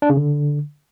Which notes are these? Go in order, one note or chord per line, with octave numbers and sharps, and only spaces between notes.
D4
C#3
D3